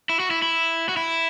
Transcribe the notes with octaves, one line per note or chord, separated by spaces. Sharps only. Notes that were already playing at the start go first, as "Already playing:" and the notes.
E4
F#4
E4
E4
F#4
E4